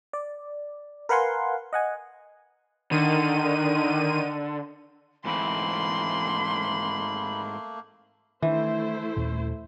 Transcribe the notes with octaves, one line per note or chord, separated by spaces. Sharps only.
D5
A#4 B4 F5 F#5 G#5 C6
D#5 F#5 G#5
D3 D#3 D#7
G#2 E3 A3 A#3 C4 B5 C6
D#3 E3 A3 D4 E4 C5
D#2 A#2